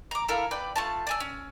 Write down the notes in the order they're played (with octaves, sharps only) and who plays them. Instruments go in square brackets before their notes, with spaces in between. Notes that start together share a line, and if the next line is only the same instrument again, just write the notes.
[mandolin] A#5 D6
E4 A4 A#4 F5
B4 D5 G5
A3 F4 A5
D5 G#5 E6
C#4